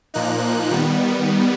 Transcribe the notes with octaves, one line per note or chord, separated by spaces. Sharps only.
A#2 F3 A#3 D#4 F#6
D#3 G3 B3